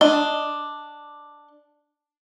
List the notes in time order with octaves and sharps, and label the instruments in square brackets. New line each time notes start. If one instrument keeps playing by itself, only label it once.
[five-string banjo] D4 D#5